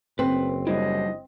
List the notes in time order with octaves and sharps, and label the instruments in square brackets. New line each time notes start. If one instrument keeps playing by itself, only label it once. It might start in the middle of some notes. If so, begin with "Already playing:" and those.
[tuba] F#1 [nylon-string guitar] C4 [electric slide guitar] B4
[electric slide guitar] F#3 G3 E4 [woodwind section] D4 C5 D#5